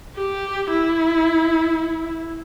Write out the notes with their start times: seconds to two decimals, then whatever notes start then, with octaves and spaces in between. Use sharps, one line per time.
0.17 G4
0.71 E4